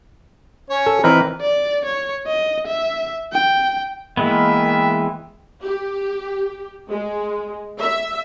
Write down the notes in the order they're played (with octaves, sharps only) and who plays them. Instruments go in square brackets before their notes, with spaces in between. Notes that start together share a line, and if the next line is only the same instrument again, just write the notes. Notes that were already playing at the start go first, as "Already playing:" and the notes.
[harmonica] C#4 C#5
[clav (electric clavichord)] A4
[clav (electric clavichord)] E3 C4 D#4 [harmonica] A#4 B4
[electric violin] D5
C#5
D#5
E5
G5
[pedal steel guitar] E3 G#3 B3 [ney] A#3 [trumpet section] E5 [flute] G5
[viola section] G4
G#3
E5